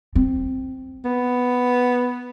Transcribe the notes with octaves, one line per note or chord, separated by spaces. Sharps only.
C4
B3